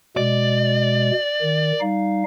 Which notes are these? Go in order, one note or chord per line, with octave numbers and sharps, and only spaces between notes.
B2 G#3 D5
D#3
G3 D#4 F5